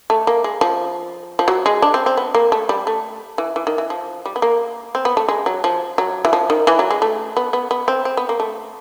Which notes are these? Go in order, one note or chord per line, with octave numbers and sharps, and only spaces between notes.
A3
A#3
G#3
F3
F3
F#3
G#3
D4
C4
C4
B3
A#3
A3
G3
A3
E3
E3
D#3
E3
F3
G3
B3
A#3
C4
B3
A3
G#3
F#3
F3
F#3
E3
F3
D#3
E3
F#3
G#3
A3
B3
B3
B3
C4
C4
B3
A#3
A3